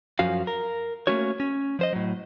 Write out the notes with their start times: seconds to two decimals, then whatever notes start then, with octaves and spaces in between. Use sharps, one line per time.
0.19 F#2 F3 C#4 F#4 F5
0.47 A#4
1.07 A3 A#3 C#4 F#4 C#5
1.40 C#4
1.79 F3 C5 D#5
1.93 A2 F#3